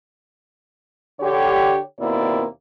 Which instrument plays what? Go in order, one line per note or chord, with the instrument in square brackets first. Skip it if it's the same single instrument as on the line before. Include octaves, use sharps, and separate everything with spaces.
[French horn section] D3 G4 C#5
D#2 B2 A#3 C4 E4 D5